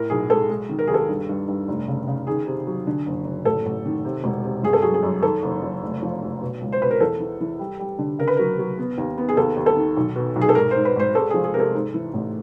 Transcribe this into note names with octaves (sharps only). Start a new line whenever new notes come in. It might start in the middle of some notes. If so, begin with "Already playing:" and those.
Already playing: A2 A#4
B1 G#4
G#3 A4
G#3
D#3
A#4
D#2 G#4
A4
G2
G2
G2
F1
C#3
C#3
D#3 G#4
C3
F#3
D3
F#1
F#1
A1 A4
A1
D#3
C3
E1
C3
G1 G#4
A4
F#3 G#4
G#4
F#2
D#3 A4
F#1
F#2
F1
F3
F1
B2
C#2
C5
B2 B4
A#4
E2 A4
E3
E3
G3
G3
D3
C#3 A#4
B4
F#3 A#4
F#3
B3
D#2
B3
G#4
D#2 A4
D#2
A4
D#3
B1
B2
B1
G#4
A4
G#1 A#4
C5
G#2
B4
G#1 C5
G#3 A4
F3 G#4
G#4
C3 A#4
A4
G#2
E3
A1